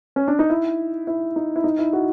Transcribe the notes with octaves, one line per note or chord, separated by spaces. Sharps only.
C#4
D4
D#4
E4
E4
D#4
E4
D#4
E4
F#4